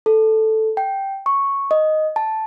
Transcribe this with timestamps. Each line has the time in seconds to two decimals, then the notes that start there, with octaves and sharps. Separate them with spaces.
0.06 A4
0.77 G5
1.26 C#6
1.71 D#5
2.16 A5